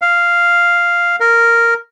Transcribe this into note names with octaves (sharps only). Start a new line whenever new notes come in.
F5
A#4